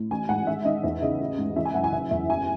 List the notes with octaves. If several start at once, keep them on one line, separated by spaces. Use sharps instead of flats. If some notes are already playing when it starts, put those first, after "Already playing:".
Already playing: A2
A1 G#5
G#2 F#5
D#3 E5
D#3 D#5
E2 E5
C#3 D#5
A1
G#2
E3 E5
G#5
F#2 F#5
G#5
F#1 E5
E2 E5
A1 G#5